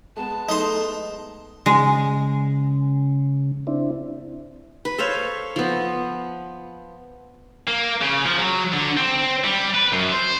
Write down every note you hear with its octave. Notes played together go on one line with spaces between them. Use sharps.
G#3 B3 A5
A3 D#4 C6
C#3 G#3
C4 D4 E4
B4
A4 C5 C#5 F5
F3 B3
A#3
C#3
F3
F#3
D3
C4
G3
B4
F#2
C5